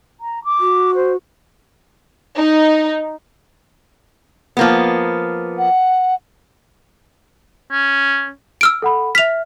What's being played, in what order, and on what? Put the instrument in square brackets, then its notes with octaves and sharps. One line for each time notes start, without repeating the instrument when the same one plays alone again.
[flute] A#5
D6
[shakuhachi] F#4
[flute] C5
[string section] D#4
[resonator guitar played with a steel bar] F3 A#3 B3
[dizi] F#5
[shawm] C#4
[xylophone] E6 F6 D7
[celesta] A4 F#5 B5
[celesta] E5 F6 [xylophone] B6 F7